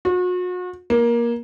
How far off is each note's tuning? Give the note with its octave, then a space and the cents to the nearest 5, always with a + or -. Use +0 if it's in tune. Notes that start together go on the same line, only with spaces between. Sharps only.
F#4 -40
A#3 +20